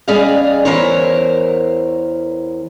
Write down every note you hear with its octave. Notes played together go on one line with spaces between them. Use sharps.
G3 C#4 G#4 D5 D#5 F5
E2 B2 E3 A#4 C5 C#5